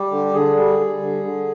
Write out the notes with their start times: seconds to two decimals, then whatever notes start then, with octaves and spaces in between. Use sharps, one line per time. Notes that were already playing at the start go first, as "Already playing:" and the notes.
Already playing: G3 G4
0.11 D3
0.33 D3 G#4
0.57 G3
0.79 G3
1.02 D3
1.24 D3